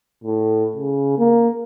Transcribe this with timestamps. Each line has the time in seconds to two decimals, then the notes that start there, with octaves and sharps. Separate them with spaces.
0.24 A2
0.76 C#3
1.18 A#3